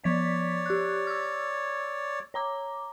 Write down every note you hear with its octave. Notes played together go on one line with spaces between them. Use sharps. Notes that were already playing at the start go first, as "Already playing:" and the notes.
F3 C#5 D5 B6
G4 F#6
E6 F6
C#5 A#5 D6